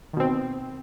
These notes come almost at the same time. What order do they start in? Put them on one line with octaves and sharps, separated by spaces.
D#3 B2 C4